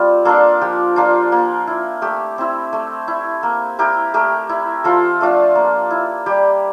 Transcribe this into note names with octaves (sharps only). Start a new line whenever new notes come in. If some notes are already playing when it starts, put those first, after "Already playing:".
Already playing: G3 C4 F4 G4
A#3 D4 F4 A4
F3 G4
A#3 D4 F4
A#3
E4
A3 G4
C4 E4
A3
E4
A#3
E4 G4 A#4
A3 G4 A#4
E4
F3 F4 A4
A3 D4 F4
A#3
E4
G3 G4